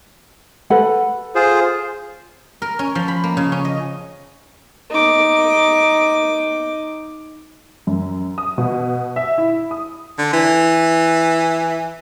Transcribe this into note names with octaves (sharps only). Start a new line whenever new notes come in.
A4 B4 F#5
F4 G#4 C5
A#4
C#4
F3
B5
A#3
C#3
C#4
D#5
D#4 D6
F#2
D#6
B2
E5
E4
D#6
D3
E3